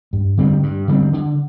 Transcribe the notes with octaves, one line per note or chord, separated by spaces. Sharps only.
G2
D3 G3 C4
G2
D3 G3 C4
D3